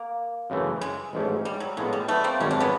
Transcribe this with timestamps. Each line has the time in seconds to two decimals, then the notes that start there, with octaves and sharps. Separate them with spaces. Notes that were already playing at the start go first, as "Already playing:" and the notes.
Already playing: A#3
0.50 F#2 C#3 E3 A3
0.81 G#3
1.13 A1 G#2 F3 A3 C#4
1.45 G3
1.60 F#3
1.77 A2 F3 F#3 G#3 B3
1.93 G3
2.08 A3 B3
2.24 A#3 C4
2.40 G#1 F#2 D#3 G3 C#4
2.51 D4
2.60 B3 C#4